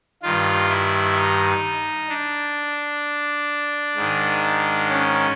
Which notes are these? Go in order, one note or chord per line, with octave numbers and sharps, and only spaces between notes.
G2 D#3 F4
E4
D#4
D4
G#2 D#3
C#4